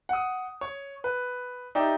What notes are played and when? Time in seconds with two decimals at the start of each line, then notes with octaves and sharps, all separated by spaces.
0.09 F#5 D#6
0.61 C#5
1.04 B4
1.75 D#4 G4 D5 E5